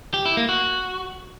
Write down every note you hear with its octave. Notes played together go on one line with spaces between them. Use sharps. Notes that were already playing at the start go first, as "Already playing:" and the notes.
G4
E4
A#3
F#4